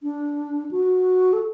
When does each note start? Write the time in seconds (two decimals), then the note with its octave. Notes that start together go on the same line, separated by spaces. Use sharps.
0.03 D4
0.71 F#4
1.33 A4